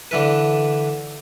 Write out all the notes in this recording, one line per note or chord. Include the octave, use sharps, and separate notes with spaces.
D3 E3 B4